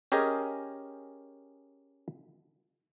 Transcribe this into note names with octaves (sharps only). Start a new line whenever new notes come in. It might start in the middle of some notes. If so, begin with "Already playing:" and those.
C#4 G4 G#4 A#4 D#5